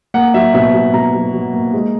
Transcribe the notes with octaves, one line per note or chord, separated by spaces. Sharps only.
A#3 F#5
F#3 E5
B2 E5
F#3
B2 A#5
F#3
F#3
A#3
G#3